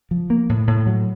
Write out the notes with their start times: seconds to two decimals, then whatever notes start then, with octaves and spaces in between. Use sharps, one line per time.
0.11 F3
0.30 A#3
0.49 A2
0.67 A2
0.87 F#3